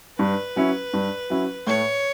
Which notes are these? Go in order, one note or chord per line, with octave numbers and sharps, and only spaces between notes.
G2 B4
F#3 C#4 E4
G2
F#3 C#4 E4
A2 C#5